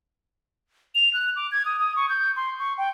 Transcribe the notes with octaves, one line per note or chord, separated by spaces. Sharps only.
F7
F#6
D6
G#6
D#6
D#6
C#6
G6
C6
C#6
G5